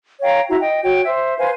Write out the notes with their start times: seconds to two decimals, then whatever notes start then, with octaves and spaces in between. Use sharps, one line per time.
0.21 C#5 F5 G5 A#5
0.48 E4 F#4 A#5
0.61 D#5 G5
0.83 F#4 C#5 G5
1.04 C5 E5
1.39 B4 C5 F5 G#5